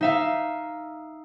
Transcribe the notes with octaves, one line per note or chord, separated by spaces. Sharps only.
D#4 E5 F5